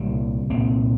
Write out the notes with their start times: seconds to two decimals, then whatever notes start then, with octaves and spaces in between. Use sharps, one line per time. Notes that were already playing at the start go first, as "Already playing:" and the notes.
Already playing: C2 A#2 G3
0.49 C2 A#2 C4